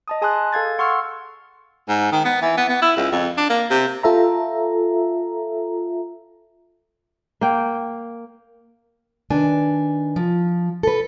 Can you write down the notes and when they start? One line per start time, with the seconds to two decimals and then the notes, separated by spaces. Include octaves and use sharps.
0.08 D#5 A5 D#6
0.22 G#4 G#5 A5 C6 D#6 F#6
0.53 A4 F5 G#6 A6
0.79 F#5 C6 C#6 E6 F6
1.89 G#2
2.12 D#3
2.25 B3
2.42 E3
2.57 B3
2.69 B3
2.82 E4
2.97 C#2
3.12 F2
3.38 D4
3.50 A#3
3.70 C3
4.03 F4 A4 E5 A#5
7.41 A#3 G5
9.30 D#3 D4 B4 G#5
10.16 F3
10.83 A4 B4